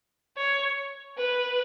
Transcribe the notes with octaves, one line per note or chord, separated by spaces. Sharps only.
C#5
B4